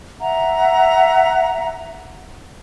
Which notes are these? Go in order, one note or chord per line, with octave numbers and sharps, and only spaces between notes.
E5 F#5 A#5